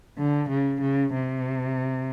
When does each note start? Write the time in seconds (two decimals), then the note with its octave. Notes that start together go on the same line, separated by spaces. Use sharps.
0.18 D3
0.49 C#3
0.82 C#3
1.13 C3